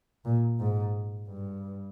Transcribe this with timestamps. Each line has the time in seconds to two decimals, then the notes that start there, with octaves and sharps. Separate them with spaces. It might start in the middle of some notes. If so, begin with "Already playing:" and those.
0.25 A#2
0.60 G#2
1.29 G2